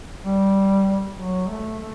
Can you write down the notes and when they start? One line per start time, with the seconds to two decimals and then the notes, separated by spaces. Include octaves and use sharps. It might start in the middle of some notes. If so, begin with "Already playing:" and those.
0.23 G3
1.17 F#3
1.48 A3
1.79 A3